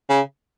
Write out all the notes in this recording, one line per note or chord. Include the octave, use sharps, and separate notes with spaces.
C#3